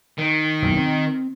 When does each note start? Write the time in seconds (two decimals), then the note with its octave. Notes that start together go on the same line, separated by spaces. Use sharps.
0.18 D#3
0.62 F#1 B1 E2
0.77 C4